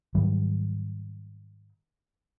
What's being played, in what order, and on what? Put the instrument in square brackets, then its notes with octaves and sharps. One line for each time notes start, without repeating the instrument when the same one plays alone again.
[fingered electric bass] G#2 D#3 F#3 G3